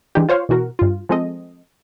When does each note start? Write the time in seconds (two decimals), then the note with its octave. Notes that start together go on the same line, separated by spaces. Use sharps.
0.15 E3 G#3 D4 D#4 G4
0.29 F4 C5 C#5 F5
0.49 B2 E3 F#4 A#4
0.79 G2 F4
1.09 F3 G#3 C4 A4 D#5